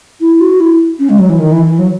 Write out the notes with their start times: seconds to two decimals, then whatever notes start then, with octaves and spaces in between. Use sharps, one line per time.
0.21 E4
0.40 F#4
0.60 E4
0.99 C#4
1.09 G#3
1.18 F#3
1.29 E3
1.39 D#3
1.52 E3
1.65 E3
1.78 F#3